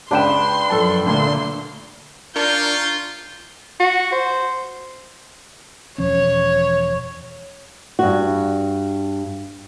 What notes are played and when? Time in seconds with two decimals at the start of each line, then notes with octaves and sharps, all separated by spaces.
0.11 C#2 D4 B4 G5 C6 E7
0.70 F#2 F3 A4 A5
1.06 D2 A#2 D3 A3 C6
2.36 D4 F4 A#4 C#6 G6
3.80 F#4
4.12 C5
5.98 E1 F3 C#4 C#5
7.99 G2 F#4